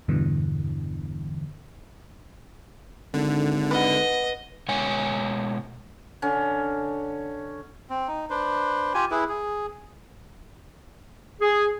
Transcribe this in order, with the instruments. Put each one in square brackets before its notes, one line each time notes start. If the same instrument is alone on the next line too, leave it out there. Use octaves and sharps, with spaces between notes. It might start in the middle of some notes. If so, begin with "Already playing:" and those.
[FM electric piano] E2 G2 B2 D3 E3
[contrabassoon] G#1 [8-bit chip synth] D3
[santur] B4 F#5 [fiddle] D#5
[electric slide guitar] B2 G#3 C#5 G#5
[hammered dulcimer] D3 C#4
[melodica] C4
D#4
D4 B4 C5
F4 G4 G#5
E4 G#4 B4
G#4
[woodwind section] G#4